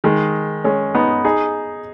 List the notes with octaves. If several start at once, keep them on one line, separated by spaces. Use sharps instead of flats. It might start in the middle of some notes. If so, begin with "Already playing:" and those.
D#3 G#3
G#3 C#4
B3 D#4
D#4 G#4